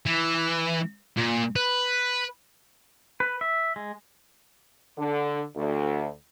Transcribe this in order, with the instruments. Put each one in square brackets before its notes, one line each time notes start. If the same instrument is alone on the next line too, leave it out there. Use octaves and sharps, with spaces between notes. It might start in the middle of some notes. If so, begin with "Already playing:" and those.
[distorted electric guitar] E3
A#2
B4
[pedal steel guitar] B4
E5
G#3
[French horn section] D3
D2